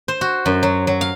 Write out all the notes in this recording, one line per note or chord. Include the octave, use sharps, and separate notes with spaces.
C5
F#4
F#2
F#3
F#3
F5